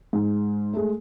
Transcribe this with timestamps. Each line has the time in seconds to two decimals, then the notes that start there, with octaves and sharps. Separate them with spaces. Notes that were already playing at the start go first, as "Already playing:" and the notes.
0.13 G#2
0.73 G#3 A3